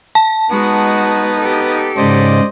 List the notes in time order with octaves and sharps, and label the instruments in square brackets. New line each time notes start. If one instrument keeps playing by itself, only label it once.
[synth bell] A5
[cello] G#3 F#4 [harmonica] B3 D#4
[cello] G4 A4
[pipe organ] G#2 C#3 [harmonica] C5 D5 D#5